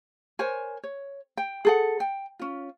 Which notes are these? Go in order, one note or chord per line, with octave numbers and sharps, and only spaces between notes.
A#4 C5 C#5 G#5
C#5
G5
G#4 A4 F#5
G5
C#4 F4